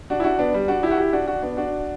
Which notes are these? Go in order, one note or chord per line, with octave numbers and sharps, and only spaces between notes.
D4 F#4
E4
D4 F#4
B3 D4
G3
D4 F#4
E4 G4
F#4
E4 G4
D4 F#4
D4 F#4
B3 D4
D4 F#4